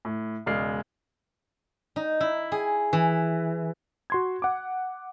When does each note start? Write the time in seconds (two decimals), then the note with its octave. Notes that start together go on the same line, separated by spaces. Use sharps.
0.05 A2
0.46 E1 C#3 G#3 D5 F6 C7
1.96 D#4
2.20 E4
2.52 G#4
2.93 E3
4.10 F#4 C6 G#6
4.42 F#5 D6